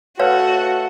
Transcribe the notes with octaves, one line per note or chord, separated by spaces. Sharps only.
A3 F#4 A4 B4 C#5 F5 F#5